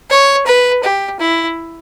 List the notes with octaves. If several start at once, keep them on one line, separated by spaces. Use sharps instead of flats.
C#5
B4
G4
E4